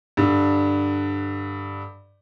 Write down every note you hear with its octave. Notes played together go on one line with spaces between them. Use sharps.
G2 D3